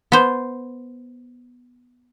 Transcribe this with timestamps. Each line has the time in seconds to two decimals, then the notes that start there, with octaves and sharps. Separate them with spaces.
0.12 B3 C5